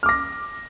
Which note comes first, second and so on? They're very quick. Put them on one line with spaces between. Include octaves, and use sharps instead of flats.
F6 D6 A#6